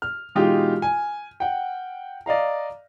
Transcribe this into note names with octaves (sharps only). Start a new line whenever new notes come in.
F6
B2 E3 G#3 D#4 F4 G4
G#5
F#5 G5
D5 D#5 F5 A#5